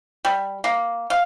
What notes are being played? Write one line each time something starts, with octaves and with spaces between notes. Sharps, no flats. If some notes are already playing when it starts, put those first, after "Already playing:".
G3
A#3
F5